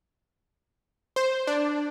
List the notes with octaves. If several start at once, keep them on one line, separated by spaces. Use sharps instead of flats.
C5
D4